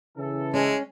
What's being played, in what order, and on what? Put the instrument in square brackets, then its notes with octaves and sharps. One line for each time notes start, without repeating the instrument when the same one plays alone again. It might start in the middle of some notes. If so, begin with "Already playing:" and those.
[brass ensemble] C#3 E3 A4
[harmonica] G#3 [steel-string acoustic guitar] C#4